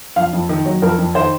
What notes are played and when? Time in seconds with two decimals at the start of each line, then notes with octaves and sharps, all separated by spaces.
0.16 F2 F5
0.33 F2
0.49 D#3
0.66 F#3
0.82 F2 A#4
0.98 F2
1.15 D#3 C5